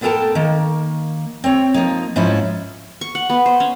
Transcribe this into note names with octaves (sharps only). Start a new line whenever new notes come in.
A2 B3 A4 A#4 G5 A5
D#3 A#3
C4 C#5 G5
F3 A#3 D#4
G#2 F3 C#4 E4 F4
C#6
F#5
B3
C5
C#4